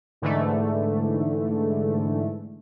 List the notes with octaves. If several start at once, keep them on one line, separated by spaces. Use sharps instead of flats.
G#2 D3 E3 A3